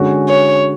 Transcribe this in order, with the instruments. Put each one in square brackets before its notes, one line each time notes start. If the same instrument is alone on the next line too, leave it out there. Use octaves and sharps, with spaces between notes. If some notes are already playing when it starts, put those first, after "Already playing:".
Already playing: [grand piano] D3 G#3 C#4 F#4
[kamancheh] C#5